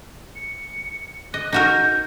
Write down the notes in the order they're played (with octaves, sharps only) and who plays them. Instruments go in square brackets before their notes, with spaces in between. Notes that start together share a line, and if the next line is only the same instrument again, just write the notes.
[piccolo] C#7
[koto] D#5 [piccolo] F#6
[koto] D#4 F#4 A#4 [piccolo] G6